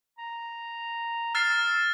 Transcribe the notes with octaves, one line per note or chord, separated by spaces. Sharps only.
A#5
E6 F6 A6 C7